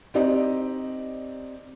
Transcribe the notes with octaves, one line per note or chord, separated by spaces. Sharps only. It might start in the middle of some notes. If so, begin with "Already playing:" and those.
C4 D#4 G4 D5 D#5